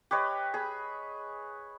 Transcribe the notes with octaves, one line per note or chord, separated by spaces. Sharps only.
G4 B4 C#5 D#5
G#4 B5